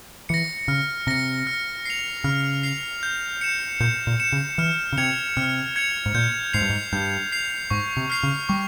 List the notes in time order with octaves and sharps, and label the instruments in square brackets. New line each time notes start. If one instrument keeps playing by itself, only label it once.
[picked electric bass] E3 [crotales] A#6 C#7
[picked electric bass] C#3 [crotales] F6
[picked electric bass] C3 [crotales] A#6 C#7
[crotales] F6
C7 F7
[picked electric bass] C#3 [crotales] F6
[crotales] C7 F7
G6
C#7 E7
[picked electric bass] A#2 [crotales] G6
[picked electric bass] A#2
[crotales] C#7 E7
[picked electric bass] C#3
[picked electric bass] E3 [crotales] F6
[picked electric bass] C#3
[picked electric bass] C3 [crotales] G#6 C#7 F7
[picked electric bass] C3 [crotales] F6
[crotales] G#6 C#7 F7
[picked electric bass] G#2
[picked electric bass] A#2 [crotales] G6
[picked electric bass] G#2 [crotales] C7 F7
[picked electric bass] G2
G#2
[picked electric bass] G2 [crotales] G6
[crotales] C7 F7
[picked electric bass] G#2 [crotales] C#6
[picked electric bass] C3
[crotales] F6 C7 F7
[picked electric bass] C#3
[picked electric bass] G3 [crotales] C#6